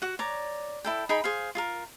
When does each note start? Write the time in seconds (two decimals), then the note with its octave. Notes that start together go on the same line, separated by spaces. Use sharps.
0.02 F#4 F#5
0.19 C#5 D5 A#5
0.84 E4 A4 G5
1.09 D#4 G#4 G5 B5
1.24 G#4 C5 F5
1.55 F4 G#4 A#4